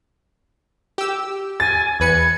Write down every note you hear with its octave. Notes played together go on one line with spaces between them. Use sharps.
G4 E6
G#5 A6
E2 B4 G#6 C#7